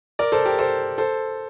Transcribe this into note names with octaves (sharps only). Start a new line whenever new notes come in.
A#4 D5
A4 C5
G4 A#4
A4 C5
A4 C5